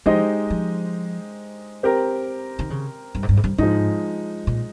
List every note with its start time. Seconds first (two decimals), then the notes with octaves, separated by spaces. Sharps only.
0.06 F3 G#3 D#4 G4 C5 D#5
0.50 F3
1.83 C4 G4 A#4
2.59 D#3
2.70 C#3
3.15 G2
3.23 G#2
3.29 G2
3.37 G#2
3.44 G2
3.58 G#2 F3 G#3 D#4
4.47 A#2